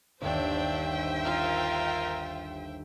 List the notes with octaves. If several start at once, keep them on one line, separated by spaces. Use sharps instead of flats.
G1 D#2 D4 C5 E5 G5
F4 A#4